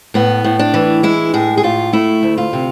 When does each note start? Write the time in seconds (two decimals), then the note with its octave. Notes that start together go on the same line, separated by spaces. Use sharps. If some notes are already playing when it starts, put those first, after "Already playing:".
0.14 A2 B3
0.44 A2
0.59 D4
0.74 E3
1.03 G#3 E4
1.34 A2 G#4
1.57 G#4
1.63 A2 F4
1.93 A3 E4
2.23 D2
2.38 F4
2.53 C3